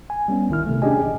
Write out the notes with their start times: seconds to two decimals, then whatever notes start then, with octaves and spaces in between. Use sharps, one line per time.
0.10 G#5
0.28 G3 B3 C#4
0.49 C2 D#3 E4 F6
0.67 C3 A3
0.82 C#4 D4 G4 G#4 D#5 G#5
1.05 A1